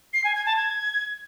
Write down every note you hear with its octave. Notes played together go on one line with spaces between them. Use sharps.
C7
G#5
G#6
A5
G#6